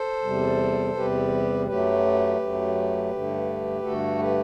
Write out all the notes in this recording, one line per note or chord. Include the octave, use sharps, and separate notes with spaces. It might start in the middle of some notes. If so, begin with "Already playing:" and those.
Already playing: A4 C5
E2 C3 G3
E2 C3 G3 G4 B4
F#2 F#3 A3 G4 B4
F#2 F#3 A3
G2 D3 A3
G2 D3 A3 F#4 A4
G4 B4